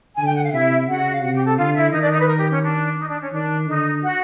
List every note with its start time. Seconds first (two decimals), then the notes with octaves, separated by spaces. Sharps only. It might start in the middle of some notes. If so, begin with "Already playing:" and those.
0.17 D3 G#5
0.26 G5
0.35 F#5
0.44 F5
0.53 C3 E4 E5
0.88 C#3 F#4 F#5
1.12 F5
1.22 C3 F#4 F#5
1.34 G4 G5
1.45 A4 A5
1.57 D3 F4 F5
1.75 E4 E5
1.92 D#3 D#4 D#5
2.01 D4 D5
2.10 D#4 D#5
2.19 B4
2.27 A#4
2.39 G4
2.50 C#4
2.62 D4
2.97 D#4
3.09 D4
3.20 C#4
3.32 D#3 D4
3.66 D3 D#4
4.01 F#4